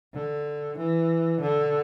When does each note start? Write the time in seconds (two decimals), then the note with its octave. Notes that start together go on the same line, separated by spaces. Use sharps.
0.14 D3
0.77 E3
1.41 D3